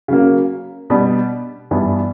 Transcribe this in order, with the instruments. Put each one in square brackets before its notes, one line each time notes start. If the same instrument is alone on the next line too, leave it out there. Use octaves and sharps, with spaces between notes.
[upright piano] C#3 F#3 A#3
B2 G3 B3 D4
G2 E3 G3 B3 D4